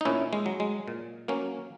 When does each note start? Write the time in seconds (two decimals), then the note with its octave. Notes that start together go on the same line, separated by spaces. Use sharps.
0.01 D#4
0.05 A#2 C#4 E4
0.33 G#3
0.46 F#3
0.60 G#3
0.88 A#2
1.28 F#3 A#3 C#4